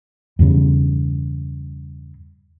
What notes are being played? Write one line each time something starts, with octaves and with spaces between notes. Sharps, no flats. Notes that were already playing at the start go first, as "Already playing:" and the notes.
E2 G2 C#3